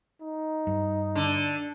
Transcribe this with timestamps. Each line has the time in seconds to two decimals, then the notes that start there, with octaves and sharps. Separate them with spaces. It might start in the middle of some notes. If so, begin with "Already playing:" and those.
0.21 D#4
0.67 G2
1.15 D3